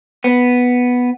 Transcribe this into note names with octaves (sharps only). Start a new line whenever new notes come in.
B3